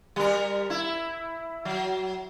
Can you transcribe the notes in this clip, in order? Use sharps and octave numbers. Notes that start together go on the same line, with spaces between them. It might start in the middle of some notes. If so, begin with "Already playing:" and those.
G3 A#4
E4
F#3